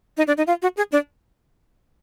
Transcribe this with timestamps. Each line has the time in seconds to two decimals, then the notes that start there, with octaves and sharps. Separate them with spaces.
0.17 D#4
0.27 D4
0.37 D#4
0.47 F4
0.62 F#4
0.77 G#4
0.92 D4